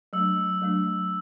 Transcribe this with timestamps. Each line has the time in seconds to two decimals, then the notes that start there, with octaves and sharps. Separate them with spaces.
0.13 F#3 A3 D4 E6
0.62 F#3 A3 D4